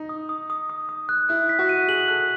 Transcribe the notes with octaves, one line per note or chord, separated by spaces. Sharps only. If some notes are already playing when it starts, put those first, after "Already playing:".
Already playing: D#4
D#6
D#6
D#6
D#6
D#6
F#6
E4 F#6
B6
F#4
D#7
G#4 F#7
A4 F#6